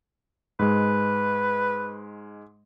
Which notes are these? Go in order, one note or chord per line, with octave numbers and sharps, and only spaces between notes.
G#2 G#3 B4